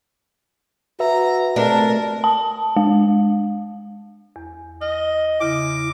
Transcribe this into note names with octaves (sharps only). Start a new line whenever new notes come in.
F#4 B4 E5 A#5
C3 A3 D4 A#4
A5
G#3
E2
D#5 F6
E2 C#3 E4 D6 A#6